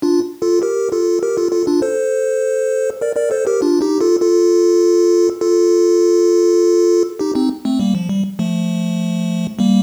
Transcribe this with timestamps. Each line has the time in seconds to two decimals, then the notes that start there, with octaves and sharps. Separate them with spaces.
0.02 D4 F4
0.42 F4 A4
0.62 G4 A#4
0.92 F4 A4
1.23 G4 A#4
1.37 F4 A4
1.52 F4 A4
1.67 D4 F4
1.82 A4 C5
3.01 A#4 D5
3.16 A#4 D5
3.31 A4 C5
3.47 G4 A#4
3.62 D4 F4
3.81 D#4 G4
4.01 F4 A4
4.21 F4 A4
5.41 F4 A4
7.19 D#4 G4
7.35 C4 D#4
7.65 A3 C4
7.80 G3 A#3
7.95 F3
8.09 G3
8.39 F3 A3
9.59 G3 A#3